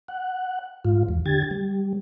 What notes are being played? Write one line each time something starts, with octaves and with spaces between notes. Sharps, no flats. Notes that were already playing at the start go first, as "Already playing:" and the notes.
F#5
G#2 F4
E2
D3 G4 G#6 A6
G3